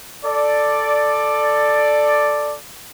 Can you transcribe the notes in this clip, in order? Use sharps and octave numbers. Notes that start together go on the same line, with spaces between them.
A4 D5